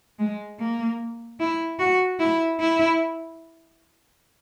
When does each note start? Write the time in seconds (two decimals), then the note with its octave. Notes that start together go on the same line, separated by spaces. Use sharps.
0.19 G#3
0.59 A#3
1.40 E4
1.79 F#4
2.20 E4
2.60 E4